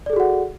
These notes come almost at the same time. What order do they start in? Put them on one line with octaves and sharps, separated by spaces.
D5 A4 G#4 F#4 F#5